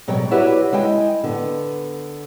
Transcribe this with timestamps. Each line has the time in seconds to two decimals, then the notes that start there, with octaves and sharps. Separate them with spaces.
0.08 B2 F#3 C#5 D5 G5
0.31 E4 F#4 G4 B4 C#5 D5
0.72 G#3 E4 D#5 G5 G#5
1.24 D3 B3